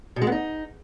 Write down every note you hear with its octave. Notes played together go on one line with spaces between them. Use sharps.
B2
G#3
B3
D#4